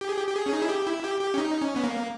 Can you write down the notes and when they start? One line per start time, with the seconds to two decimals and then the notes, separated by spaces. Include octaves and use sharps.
0.01 G4
0.09 G#4
0.17 G4
0.27 G4
0.35 G#4
0.46 C#4
0.53 D#4
0.62 E4
0.69 G4
0.87 E4
1.04 G4
1.21 G4
1.34 C#4
1.38 D#4
1.62 C#4
1.76 B3
1.84 A#3